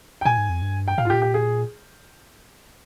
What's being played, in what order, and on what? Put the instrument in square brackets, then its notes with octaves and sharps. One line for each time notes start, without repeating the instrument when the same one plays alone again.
[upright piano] G5
[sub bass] A#2 [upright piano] G#5
[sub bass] G#2
F2
G2
[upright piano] G5
[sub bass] A#2 [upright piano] F5
[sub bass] G#2 [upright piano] F4
[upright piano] G4
[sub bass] A#2
[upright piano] G4
G#4